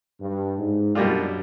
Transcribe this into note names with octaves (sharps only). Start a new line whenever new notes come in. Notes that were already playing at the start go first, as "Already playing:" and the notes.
G2
G#2
F#2 B2 G3 A#3 D4 F4